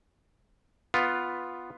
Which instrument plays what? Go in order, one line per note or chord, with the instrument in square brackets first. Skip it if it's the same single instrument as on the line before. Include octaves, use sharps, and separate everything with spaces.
[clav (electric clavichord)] B3 F4